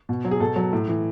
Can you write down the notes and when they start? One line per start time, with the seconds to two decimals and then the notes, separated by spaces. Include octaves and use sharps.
0.09 B2
0.25 F#3
0.31 G#4
0.40 B2 A4
0.56 F#3
0.73 A2
0.88 E3